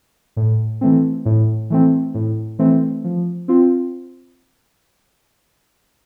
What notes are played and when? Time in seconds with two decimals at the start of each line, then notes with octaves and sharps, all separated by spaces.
0.37 A2
0.81 E3 A3 C4
1.25 A2
1.70 E3 A3 C4
2.14 A2
2.59 E3 A3 C4
3.04 F3
3.48 C4 F4